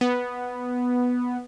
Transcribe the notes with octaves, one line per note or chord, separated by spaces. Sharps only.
B3